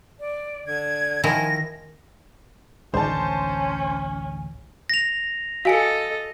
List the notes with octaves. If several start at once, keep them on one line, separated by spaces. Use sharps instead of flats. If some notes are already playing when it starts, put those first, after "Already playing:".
D5
D3 G#6
D#3 F3 E4 G#5 A#6
A1 D2 D#3 G#3 C#4 D4 C5 A5
A#6 F7
F#4 A4 D#5 F5 G#5 C#7